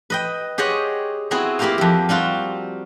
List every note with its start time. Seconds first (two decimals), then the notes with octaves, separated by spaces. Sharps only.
0.10 B4 D#5 G5
0.58 G4 G#4 C5 C#5 D#5 F#5
1.31 B3 C4 E4 F#4 G#4
1.59 A#3 E4 G4 A#4 C5 F5
1.78 F2 G4
2.09 G3 C4 F4 F#4